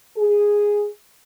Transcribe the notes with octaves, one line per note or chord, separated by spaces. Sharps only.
G#4